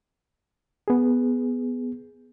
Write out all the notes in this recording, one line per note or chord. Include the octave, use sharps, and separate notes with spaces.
B3 G#4